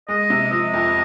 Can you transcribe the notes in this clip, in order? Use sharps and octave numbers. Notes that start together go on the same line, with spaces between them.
G#3 D#5
C3
F3 D#5
F2